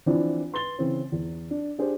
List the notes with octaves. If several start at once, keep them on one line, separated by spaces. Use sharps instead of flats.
E3 F3 C4 D4 E4
B4 C6 A6 G7
C#3 E3 C4
E2
D4
D4 G4 G#4 C5